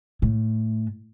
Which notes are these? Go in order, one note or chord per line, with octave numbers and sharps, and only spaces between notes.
A2